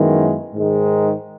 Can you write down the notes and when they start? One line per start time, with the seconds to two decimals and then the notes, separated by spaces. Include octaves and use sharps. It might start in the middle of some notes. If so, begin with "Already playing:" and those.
Already playing: F#2 D#3 G#3 B3 E4
0.53 G#2 D#3 G#3